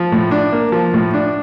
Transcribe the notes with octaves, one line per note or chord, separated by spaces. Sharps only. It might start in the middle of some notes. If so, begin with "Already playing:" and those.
Already playing: F3
A2
D4
A#3
F3
A2
D4